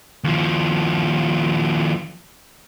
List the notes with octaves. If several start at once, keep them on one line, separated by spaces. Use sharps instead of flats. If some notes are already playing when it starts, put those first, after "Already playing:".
D#2 F3